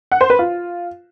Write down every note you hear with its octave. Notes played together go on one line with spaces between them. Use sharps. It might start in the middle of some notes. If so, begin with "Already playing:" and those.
F#5
C5
B4
F4